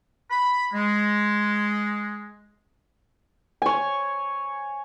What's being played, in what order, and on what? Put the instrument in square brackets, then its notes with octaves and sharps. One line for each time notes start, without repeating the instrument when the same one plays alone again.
[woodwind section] B5
G#3
[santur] C#5 G#5